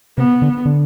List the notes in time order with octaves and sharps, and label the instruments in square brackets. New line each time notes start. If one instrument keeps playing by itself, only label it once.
[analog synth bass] C3 [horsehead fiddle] B3
[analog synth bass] D3
D3